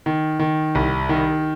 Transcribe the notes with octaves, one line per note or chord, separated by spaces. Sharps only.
D#3
D#3
C2
D#3